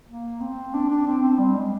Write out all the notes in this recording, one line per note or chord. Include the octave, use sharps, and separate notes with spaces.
A#3
C4
D4
D4
C4
C4
G3
G#3